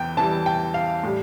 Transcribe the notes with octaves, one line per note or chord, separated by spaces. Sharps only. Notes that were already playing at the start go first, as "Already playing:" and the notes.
Already playing: E2 E3 G5
E2 E3 G3 A5
G5
F5
A2 G3